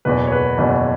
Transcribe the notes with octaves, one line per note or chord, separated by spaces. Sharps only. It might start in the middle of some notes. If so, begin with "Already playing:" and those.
F#1 E2 B2 B4
C#5
B4
F#1 E2 B2